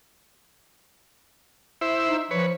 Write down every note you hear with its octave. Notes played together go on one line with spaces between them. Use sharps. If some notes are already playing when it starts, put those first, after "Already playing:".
E4 C5 E5
D#4
F3 B4 C#5